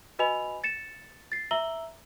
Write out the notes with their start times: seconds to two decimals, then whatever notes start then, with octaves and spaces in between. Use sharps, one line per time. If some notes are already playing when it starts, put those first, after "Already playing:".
0.19 F#4 B4 D#5 G#5 B5 F7
0.64 A6 C#7 E7
1.32 A6 C7
1.51 E5 A#5 E6 F#7 G7